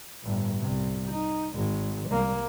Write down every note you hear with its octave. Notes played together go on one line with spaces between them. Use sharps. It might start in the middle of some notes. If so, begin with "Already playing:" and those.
G1 A2
C2 C3
D#4
G#1 G#3
C2 A#3